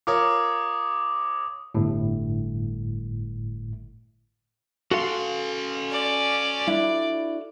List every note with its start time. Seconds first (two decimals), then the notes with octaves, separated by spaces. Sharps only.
0.07 F4 A#4 C#5 D6 D#6
1.75 G1 A2
4.91 C#4 F#4 A4 F5 C6
5.91 D5
6.67 D4 E4 F4